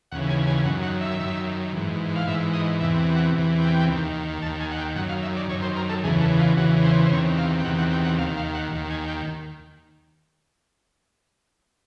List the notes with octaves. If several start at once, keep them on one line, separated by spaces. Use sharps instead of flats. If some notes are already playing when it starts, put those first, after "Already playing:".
D#2 C#3 E3 F#5
G#5
G#5
F#2 D#3 F#5
F#5
E5
F#2 D#3
G#2 E3
F5
G#2 E3 E5
D#5
E2 C3 E3 E5
F#5
E2 C3 E3
G5
D#2 D#3
D#2 D#3 A5
G#5
F#5
G5
F#2 D#3 F#5
F5
E5
D5
F#2 D#3 C#5
C5
A#4
A4
E2 C#3 E3 G#4
A4
F4
E2 C#3 E3 F#4
C5
C5
E2 C3 D#3 C#5
F5
G5
E2 C3 D#3 F#5
F#5
G5
F#5
D#2 D#3 F5
F5
F#5
D#2 D#3
G#5
G5